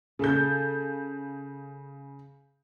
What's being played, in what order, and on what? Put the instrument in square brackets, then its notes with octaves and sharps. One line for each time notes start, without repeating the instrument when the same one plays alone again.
[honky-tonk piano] C#3 G6 [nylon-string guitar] G#4 A4